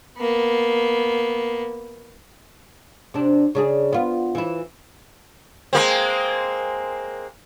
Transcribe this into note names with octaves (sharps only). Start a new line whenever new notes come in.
A#3 B3
C3 D4
C#3 D4 G#4
B3 F4
E3 E4
G#3 A#3 C4